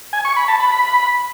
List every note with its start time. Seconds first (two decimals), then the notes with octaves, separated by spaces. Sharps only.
0.13 G#5
0.25 C#6
0.36 B5
0.48 A5
0.60 B5